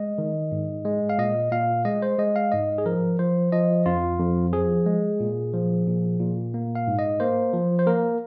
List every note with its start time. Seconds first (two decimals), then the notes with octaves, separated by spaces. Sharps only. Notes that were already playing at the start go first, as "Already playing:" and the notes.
Already playing: G#3 D#5
0.18 D#3
0.52 G#2
0.85 G#3
1.09 F5
1.18 A#2 D#5
1.52 A#2 F5
1.85 G#3 D#5
2.02 C5
2.18 G#3 D#5
2.36 F5
2.52 G#2 D#5
2.78 G#4
2.86 F3 A#4
3.19 F3 C5
3.52 F3 D#5
3.86 F2 F4
4.19 F2
4.53 F3 G#4
4.86 G#3
5.20 A#2
5.54 F3
5.87 A#2
6.20 A#2
6.54 A#3
6.75 F5
6.87 G#2
6.99 D#5
7.20 A#3 C5
7.54 F3
7.79 C5
7.87 A#3 A#4